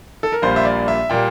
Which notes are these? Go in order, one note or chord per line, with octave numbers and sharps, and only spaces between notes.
A4
A#4
A#1 A#2 G3 A#3 C5
E5
D5
E5
A#2 G3 A#3 G5